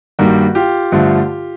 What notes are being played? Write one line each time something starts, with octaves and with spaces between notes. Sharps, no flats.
G2 D#3 G3 A#3 F#4
F4 G4
G2 D3 F3 A3